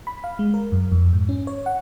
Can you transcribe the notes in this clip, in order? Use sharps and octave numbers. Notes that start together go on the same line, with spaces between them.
B5
F5
G#3
A#4
F#2
F2
G#2
C#4
C#5
F#5